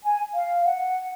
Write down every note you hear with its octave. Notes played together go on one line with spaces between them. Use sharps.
G#5
F5
F#5